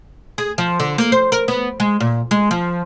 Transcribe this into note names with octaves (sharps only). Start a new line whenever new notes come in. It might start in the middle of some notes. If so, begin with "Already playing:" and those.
G#4
F3
D3
A#3
C5
A#4
B3
G#3
A#2
G#3
F3